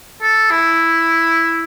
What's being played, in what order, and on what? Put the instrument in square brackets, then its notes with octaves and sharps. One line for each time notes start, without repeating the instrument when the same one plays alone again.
[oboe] A4
E4